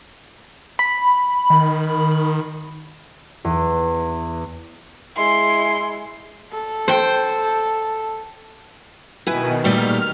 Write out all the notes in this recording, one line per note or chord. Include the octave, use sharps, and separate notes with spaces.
B5
D#3
E2
G#3 E4 C6
A4
C5 G5
B2 D#3 E4 B4 G#5
A#2 G3 A3 F6